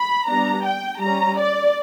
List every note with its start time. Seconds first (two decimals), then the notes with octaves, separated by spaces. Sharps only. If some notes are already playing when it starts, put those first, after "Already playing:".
Already playing: B5
0.28 G3 B3 D4 A#5
0.64 G5
1.01 G3 C#4 A#5
1.38 D5